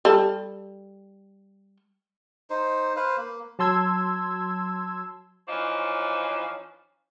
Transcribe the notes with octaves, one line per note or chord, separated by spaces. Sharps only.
G3 A4
D#4 C5
B4 C5 F5
A#3
F#3 A5 C6 E6 G#6
E3 F3 C#4 D#4 C5 D5